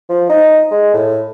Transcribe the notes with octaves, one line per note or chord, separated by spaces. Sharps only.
F3
D#4
G#3
A2